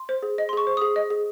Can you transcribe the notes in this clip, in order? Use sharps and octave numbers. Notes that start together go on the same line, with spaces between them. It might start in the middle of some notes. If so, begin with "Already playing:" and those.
Already playing: C6
C5
G#4
D#5
C6
G#4 C#6
C5
G#4 D#6
D#5
G#4